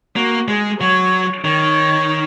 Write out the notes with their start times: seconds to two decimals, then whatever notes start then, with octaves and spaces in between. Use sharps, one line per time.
0.16 A#3 F#4
0.48 G#3 G#4
0.80 F#3 C#5
1.45 D#3 C#5